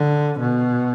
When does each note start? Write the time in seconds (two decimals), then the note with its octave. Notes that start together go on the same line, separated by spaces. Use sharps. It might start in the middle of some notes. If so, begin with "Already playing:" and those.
Already playing: D3
0.40 B2